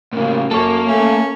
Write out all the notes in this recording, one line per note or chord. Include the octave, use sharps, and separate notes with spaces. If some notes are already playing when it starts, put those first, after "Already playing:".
A2 C#3 A#3
F#2 A#3 A4 C#5
A3 C#4